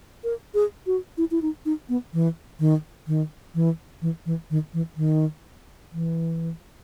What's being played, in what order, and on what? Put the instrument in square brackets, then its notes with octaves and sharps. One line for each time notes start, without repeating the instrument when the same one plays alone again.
[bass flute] A#4
G#4
F#4
E4
E4
D#4
D#4
B3
E3
D#3
D#3
E3
E3
E3
D#3
E3
D#3
E3